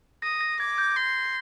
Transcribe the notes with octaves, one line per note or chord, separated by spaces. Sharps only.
D#6 A#6
A#6
D6 G#6
G6
C6